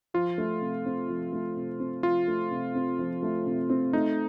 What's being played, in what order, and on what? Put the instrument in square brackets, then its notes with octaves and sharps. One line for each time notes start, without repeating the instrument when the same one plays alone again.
[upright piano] F3 [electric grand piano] F4
[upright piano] A3
C3
C4
F3
A3
C3
C4
[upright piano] F3 [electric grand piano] F4
[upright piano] A3
C3
C4
F3
A3
C3
C4
[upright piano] A3 [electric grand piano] D#4